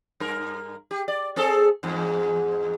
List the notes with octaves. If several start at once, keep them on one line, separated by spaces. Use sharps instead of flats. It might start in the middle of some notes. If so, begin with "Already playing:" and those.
G2 A#4
G4
D5
C4 G#4 A4
E2 G#2